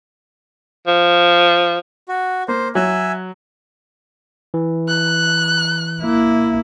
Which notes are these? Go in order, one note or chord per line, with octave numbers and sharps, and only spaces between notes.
F3
F#4
A#3 C5
F#3 E5 G#5
E3
F#6
A#3 E4